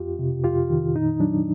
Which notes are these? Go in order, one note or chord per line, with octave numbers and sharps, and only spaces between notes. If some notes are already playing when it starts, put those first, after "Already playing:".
Already playing: F2 F4 G4
C3
F2 F4 G4
D#3
A#2 D#4
F#3 D4